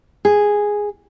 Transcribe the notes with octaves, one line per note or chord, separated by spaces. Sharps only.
G#4